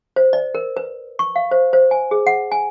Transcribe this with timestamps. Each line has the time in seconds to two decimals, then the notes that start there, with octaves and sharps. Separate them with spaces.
0.16 C5
0.33 D5
0.55 A#4
0.77 B4
1.19 C#6
1.36 F5
1.51 C5
1.73 C5
1.91 G#5
2.11 G#4
2.27 F#5
2.52 G#5